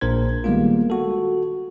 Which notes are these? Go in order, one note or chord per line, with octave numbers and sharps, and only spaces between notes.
A#1 A#2 D4 A#4 C5 G#6
D#3 G3 G#3 A#3 B3 F4
F#4 A4